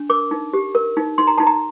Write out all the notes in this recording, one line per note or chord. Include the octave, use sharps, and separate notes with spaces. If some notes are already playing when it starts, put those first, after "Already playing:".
Already playing: D4
A#4 D6
D#4
G4
A#4
D#4
D#4 C6
A#5
D#4 A5
A#5